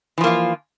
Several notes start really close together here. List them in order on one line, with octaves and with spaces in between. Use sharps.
E3 F3 A#3 F4